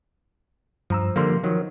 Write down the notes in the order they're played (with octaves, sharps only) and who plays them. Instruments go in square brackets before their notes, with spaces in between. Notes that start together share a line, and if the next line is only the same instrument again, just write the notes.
[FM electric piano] G2 A#5 E6 [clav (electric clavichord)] F3
[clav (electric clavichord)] D3 G3 A#3 [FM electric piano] F3 C6
[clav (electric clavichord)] D#3 F#3 [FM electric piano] F3